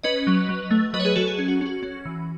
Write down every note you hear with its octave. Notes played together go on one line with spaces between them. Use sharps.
C#4 B4 D#5
F#3
F#3
A3
F#3 B4 D#5
C#5
G#4 B4
F#3 F#4 A4
G#4
C#4 G#4
F#4
C#4 F#4
C#4
E3